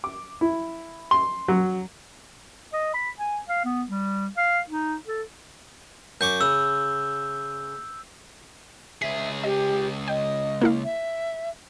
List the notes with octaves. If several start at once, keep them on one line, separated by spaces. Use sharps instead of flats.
D6
E4
C6
F#3
D#5
B5
G#5
F5
B3
G3
F5
D#4
A4
F#2 C#6 D6 G6
C#3 E6
C#2 G#4 E5 B6
G4 D#5
D#5 G5
A#3 E4 F5
E5